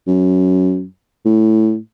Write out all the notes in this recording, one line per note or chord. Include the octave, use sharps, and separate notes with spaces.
F#2
A2